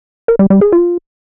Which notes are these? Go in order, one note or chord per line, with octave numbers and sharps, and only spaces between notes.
A#4
G3
G3
G#4
F4